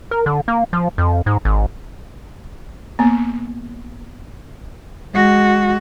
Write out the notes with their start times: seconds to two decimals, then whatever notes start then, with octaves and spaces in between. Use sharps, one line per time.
0.11 A#4
0.26 D3
0.48 A#3
0.73 F3
0.98 F2
1.26 G#2
1.45 G#1
2.99 A#3 B3
5.14 G#3 F#4